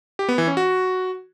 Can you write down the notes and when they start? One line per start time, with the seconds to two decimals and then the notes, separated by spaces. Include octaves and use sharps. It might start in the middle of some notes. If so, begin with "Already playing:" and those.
0.19 G4
0.29 B3
0.38 E3
0.47 C#4
0.57 F#4